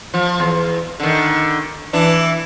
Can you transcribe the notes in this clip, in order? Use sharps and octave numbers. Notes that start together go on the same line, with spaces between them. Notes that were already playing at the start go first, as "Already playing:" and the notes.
F3
E2
D3 D#3
E3 D4